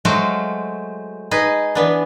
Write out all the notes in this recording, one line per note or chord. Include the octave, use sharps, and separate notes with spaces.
F#3 G#3 A3 F#4 C5 F5
D#4 G#4 B4 D#5
E3 B3 D4